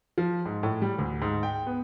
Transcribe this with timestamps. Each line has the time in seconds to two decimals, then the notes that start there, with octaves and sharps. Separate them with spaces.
0.18 F3
0.46 G#2
0.63 A2
0.82 G3
0.99 D2
1.22 G#2
1.43 G5
1.66 B3